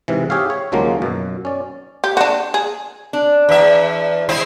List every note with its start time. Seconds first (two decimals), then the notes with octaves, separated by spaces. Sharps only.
0.08 G#2 C3 E3
0.30 G4 G#4 C#5 E5 F5
0.50 C#5
0.72 D#2 C#3 F3 F#3 G#3 A#3
1.02 F#2 B2
1.45 C#4 D5
2.04 G4
2.17 D4 F#4
2.54 G#4
3.13 D4
3.49 E2 E5
4.29 G#3 C4 E4